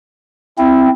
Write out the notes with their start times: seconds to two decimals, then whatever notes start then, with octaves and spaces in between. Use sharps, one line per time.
0.58 C4 E4